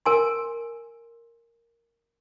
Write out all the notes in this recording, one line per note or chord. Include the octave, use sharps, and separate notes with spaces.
A#4 G#5 C6